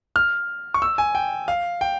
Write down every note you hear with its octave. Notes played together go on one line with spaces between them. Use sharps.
F6
C#6
E6
G#5
G5
F5
G5